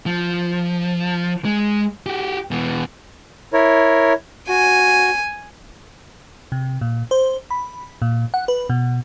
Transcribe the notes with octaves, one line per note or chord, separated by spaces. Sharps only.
F3
G#3
F#4 G4
E2 B2
E4 A#4 C#5
F#4 G#5
C3
A#2
C5
B5
A#2
F#5
B4
B2